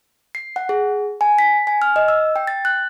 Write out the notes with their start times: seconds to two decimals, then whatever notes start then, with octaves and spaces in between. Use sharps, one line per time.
0.35 C7
0.56 F#5
0.69 G#4
1.21 G#5
1.39 B6
1.67 G#5
1.82 F6
1.96 D#5
2.08 E6
2.36 G5
2.47 A6
2.65 F#6